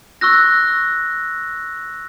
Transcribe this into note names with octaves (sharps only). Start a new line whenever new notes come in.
C#6 E6 F#6 A#6